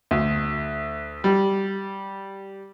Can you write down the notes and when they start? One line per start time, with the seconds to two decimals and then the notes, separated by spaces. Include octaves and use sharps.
0.11 D2
1.24 G3